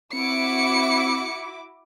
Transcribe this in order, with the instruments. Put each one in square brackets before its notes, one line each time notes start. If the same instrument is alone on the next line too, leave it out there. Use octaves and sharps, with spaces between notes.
[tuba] C4 [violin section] E4 F#4 D6 [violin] C#7